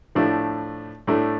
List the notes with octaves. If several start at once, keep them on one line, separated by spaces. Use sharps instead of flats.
A2 F3 A3 D4
A2 A3 D4